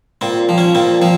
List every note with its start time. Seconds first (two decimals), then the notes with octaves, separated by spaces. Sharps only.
0.21 A#2 C4
0.49 F3
0.58 C#4
0.75 A#2 C4
1.02 F3 C4